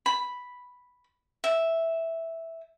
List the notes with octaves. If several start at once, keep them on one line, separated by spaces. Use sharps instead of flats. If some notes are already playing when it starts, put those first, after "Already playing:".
B5
E5